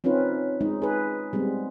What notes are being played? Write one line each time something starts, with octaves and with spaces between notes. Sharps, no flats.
C4 C#4 D#4 F4 B4
G#3 D#4
G#4 B4
G3 G#3 B3 C4